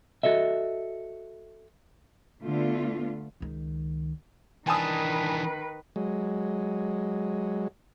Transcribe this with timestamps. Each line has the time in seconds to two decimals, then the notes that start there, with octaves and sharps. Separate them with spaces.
0.23 F#4 A4 D#5 E5
2.44 D3 A3 B3 F4
3.40 C#2 D#3
4.67 D#3 E3 D4 B4 G#5 A5 D#6
5.96 F#3 G#3